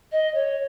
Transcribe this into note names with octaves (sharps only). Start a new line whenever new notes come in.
D#5
C#5